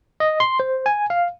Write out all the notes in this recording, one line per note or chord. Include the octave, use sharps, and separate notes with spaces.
D#5
C6
C5
G#5
F5